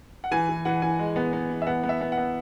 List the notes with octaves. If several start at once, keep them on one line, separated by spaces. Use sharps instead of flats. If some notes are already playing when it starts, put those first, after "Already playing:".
F#5
E3 G#5
E3
E3 F#5
E3 G#5
G#3
B3
B3
E3
E5
B3 F#5
B3
E5
B3
F#5
B3